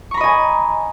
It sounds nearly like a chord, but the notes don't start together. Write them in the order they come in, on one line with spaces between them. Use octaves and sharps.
C#6 A#5 B5 D#5 G#5